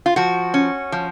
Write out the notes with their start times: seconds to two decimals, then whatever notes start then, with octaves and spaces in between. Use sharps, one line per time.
0.06 F4
0.16 F3 F#4
0.54 C#4
0.92 F3